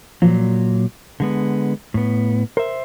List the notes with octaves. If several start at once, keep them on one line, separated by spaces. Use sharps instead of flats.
A#2 F3 F#3
D3 G#3 B3
A2 B3
A#4 C5 E5